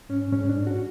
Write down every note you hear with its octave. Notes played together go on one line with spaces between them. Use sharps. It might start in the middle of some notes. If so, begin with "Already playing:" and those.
G#2 C#4
G#2 C#4
D4
G#2
F#4